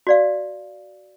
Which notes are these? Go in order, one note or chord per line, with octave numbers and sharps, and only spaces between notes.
F#4 D5 F5